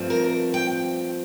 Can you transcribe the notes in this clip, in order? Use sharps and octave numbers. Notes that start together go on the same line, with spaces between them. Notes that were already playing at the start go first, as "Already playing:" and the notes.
Already playing: G2 F3 A3 C4
A#4
G5